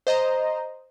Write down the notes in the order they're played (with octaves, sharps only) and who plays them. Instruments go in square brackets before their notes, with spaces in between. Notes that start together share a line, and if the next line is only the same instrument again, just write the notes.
[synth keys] C5 D#5 A#5